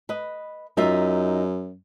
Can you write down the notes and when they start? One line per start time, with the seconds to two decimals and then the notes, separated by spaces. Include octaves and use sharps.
0.09 B4 D#5
0.77 F#2 D#4 F4 E5